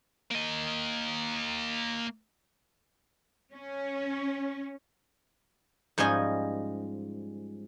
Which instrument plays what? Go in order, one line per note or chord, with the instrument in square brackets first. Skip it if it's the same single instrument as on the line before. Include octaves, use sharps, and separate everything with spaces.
[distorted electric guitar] A#3 D#5
[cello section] C#4
[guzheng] G#2 F3 G3 C#4 D#5 G#5